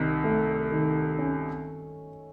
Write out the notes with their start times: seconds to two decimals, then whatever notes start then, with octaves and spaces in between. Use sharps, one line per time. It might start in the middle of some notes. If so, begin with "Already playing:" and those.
Already playing: C2 C3 D#3
0.24 A3
0.72 D#3
1.19 C#4